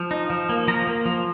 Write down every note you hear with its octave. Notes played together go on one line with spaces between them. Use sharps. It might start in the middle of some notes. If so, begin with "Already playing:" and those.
Already playing: F3
D#4
F3
A#3
F3 A#5
A#3
F3